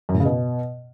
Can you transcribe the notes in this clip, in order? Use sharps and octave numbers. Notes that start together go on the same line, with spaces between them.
F#2
A2
C#3
B2